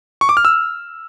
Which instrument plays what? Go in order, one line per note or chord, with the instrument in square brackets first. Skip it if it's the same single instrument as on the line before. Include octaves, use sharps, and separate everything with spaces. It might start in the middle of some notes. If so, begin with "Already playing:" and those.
[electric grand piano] C#6
D6
F6
E6